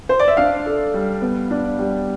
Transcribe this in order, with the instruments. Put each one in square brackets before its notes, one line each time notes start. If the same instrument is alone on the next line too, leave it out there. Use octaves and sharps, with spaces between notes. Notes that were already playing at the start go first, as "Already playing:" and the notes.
[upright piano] C5
D5
E5
[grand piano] D4 [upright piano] F5
[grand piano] A4
G3
B3
D4
G3